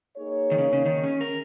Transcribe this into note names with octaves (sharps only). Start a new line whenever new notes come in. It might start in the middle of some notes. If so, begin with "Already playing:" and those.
A#3 D#4 G#4 C#5
D#3
C#3
C#3
D#3
C#4
A#4